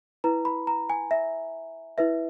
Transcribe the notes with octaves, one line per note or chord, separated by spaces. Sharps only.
E4 B4 A#5
B5
A#5
G#5
E5
E4 B4 E5